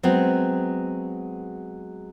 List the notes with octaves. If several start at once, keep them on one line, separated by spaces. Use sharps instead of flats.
F#3 G#3 B3 C4